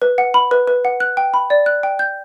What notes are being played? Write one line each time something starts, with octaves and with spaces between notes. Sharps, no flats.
B4
F#5
B5
B4
B4
F#5
F#6
G5
B5
D5
F#6
G5
G6